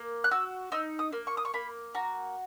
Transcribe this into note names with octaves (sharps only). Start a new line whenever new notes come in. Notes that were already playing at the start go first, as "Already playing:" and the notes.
Already playing: A#3
F#6
F#4 E6
D#4 E6
D#6
A#3
C#6
D#6
C#6
A#3 B5
F#4 A#5